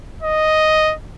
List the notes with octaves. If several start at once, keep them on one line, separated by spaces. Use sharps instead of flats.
D#5